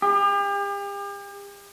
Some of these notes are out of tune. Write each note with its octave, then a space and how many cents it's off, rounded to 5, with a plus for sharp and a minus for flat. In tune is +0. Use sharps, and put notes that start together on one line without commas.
G4 +40